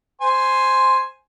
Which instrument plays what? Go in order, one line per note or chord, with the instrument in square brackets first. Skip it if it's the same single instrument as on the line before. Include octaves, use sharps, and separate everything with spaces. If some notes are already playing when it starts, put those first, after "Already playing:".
[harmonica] C5 G#5 C6